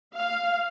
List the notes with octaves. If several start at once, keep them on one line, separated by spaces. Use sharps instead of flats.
F5